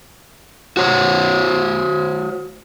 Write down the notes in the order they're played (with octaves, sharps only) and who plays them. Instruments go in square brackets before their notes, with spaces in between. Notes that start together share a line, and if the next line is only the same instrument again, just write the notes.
[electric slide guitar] F#4 C5 C#5